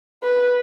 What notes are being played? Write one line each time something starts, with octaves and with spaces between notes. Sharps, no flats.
B4